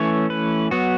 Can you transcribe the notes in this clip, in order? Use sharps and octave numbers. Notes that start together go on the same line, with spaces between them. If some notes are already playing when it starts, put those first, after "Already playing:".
Already playing: E3 A3 C#4 C#5
B4
F#3 B3 F#4